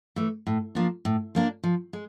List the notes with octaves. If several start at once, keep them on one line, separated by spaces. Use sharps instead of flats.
E3 A3
A2
F3 A#3 D4
A2
F3 A#3 D4
F3
G#3